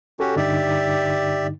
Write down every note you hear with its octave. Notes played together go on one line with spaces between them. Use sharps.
C#4 F#4 G4 A4
G2 D3 D#4 G4 D5 E5